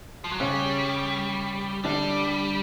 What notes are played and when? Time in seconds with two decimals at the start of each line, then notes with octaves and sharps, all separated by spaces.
0.24 F3
0.32 F#3
0.40 C#3 G3 C#4
1.84 D3 G3 D4